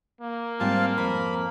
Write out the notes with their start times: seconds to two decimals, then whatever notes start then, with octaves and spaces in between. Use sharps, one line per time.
0.21 A#3
0.60 G#2 G3 C4 F4 F5 A5
0.98 F2 A#4 B5